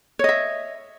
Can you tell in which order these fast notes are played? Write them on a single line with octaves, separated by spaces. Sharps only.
C#5 D#5 E5